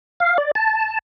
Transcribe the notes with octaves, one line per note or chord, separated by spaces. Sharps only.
F5
D5
A5